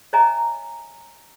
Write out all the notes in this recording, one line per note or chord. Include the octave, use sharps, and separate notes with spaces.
C#5 D#5 E5 G#5 A#5